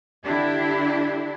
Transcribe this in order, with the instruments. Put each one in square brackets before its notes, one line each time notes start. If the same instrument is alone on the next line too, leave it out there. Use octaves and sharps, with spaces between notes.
[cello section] D3 D4 E4 G4